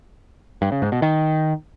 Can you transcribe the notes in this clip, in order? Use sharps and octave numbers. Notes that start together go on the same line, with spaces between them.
G2
C#3
G#2
B2
D#3